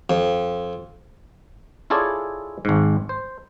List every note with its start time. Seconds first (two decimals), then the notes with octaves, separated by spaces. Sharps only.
0.10 F2
1.90 E4 F4 G#4 A4 C#5 D5
2.65 G#1 G#2
3.09 C5